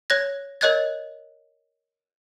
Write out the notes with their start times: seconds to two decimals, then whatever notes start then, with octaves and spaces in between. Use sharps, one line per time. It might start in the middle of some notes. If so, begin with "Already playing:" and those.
0.10 C#5 F#6 G#6 A#6
0.61 A#4 C#5 D#5 F#6 G#6 A6